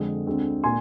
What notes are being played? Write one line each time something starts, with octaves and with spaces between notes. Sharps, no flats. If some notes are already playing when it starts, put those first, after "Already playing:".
Already playing: F2 D3 G#3 C4
D2 D3 G#3 C4
A#2 G#5 C6